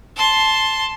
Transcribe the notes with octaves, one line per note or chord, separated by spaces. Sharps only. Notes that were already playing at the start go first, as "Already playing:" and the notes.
A5 C6